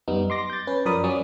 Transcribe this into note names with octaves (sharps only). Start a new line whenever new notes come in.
F#2 G3 B3 D#4
C6 D6 A#6
G6 A6
C#4 B4
F#2 F3 A#4 D5 B5 D#6
F#3 C#4 D5 D#6